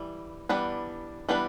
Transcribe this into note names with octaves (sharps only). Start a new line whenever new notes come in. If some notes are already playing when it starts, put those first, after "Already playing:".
Already playing: E3 G3
E3 G3 B3 D4 B4
E3 G3 B3 D4 B4